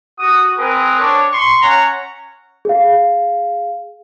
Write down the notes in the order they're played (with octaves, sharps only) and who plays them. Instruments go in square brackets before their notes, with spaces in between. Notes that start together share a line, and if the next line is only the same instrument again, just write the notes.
[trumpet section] F#4 D#6
C4 G#4 A#4 B4
D4 C#5
C6 C#6
C#4 C#5 F#5 A#5
[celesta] G#4 F5